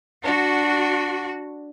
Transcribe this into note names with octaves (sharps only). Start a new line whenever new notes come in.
D4 F#4